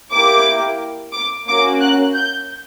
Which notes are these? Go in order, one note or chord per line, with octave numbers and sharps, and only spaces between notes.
A#3 E4 G4 D6
D6
A#3 C#4 F#4 D6
F#6
G6